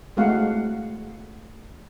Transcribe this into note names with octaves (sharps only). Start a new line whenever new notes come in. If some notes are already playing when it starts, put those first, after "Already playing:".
G#3 A3 C4 F#4 F5 F#5